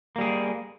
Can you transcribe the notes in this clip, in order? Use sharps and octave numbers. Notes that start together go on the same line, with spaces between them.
G3 A#3 G#4